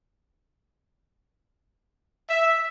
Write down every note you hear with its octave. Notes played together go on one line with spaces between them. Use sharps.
E5